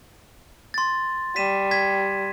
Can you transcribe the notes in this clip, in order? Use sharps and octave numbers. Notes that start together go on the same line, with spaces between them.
C6 A6
G3 B6 D#7 E7
G#6 B6